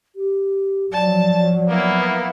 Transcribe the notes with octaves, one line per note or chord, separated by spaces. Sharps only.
G4
F3 F#3 D5 A5
A#3 B3 E4